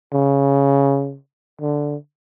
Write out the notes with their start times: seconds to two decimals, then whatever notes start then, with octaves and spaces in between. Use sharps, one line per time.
0.13 C#3
1.61 D3